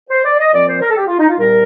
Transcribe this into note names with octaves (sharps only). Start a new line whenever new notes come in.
C5
D5
D#5
A#2 F3 C4 D5
C5
A#4
A4
G4
F4
D#4
F4
C2 A#2 G3 A#4